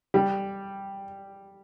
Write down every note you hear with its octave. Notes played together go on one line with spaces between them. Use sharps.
G3